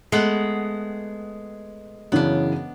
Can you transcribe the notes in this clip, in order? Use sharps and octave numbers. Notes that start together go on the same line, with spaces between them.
G#3 A3 B3 F#5
F#2 C#3 E3 B3 D4